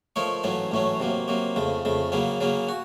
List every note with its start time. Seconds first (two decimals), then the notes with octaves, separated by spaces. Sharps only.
0.16 F3 A3 D#4 A#4 C#5
0.43 A1 A2 F#3 A3 C#4
0.71 A1 A2 F#3 A3 C#4
1.00 C3 F#3 A#3
1.28 C3 F#3 A#3
1.56 F2 C#3 A3
1.85 F2 C#3 A3
2.12 C#3 F#3 A#3 C#4
2.40 C#3 F#3 A#3 C#4
2.69 F#4